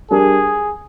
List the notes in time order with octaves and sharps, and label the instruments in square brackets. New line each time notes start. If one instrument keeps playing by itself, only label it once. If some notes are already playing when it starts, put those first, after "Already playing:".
[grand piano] G3 D4 G4 A#4 [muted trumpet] G#4